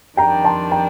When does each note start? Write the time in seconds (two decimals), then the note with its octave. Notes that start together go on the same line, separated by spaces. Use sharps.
0.17 F2 D#3 G3 D4 G5 A#5
0.45 A5 C6
0.71 G5 A#5